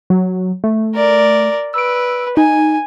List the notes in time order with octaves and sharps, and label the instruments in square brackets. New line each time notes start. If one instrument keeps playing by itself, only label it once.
[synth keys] F#3
A3
[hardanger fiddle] A#4 D5
[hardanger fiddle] B4 [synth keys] E6 D7
[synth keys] D#4 [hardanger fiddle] G#5